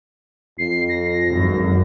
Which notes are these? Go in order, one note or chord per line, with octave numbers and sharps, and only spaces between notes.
F2 C7
A#6
G#1 F#2